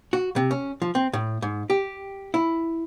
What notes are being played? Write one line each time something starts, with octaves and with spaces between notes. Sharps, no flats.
F#4
C3
C#4
F3
C4
A2
G#2
G4
E4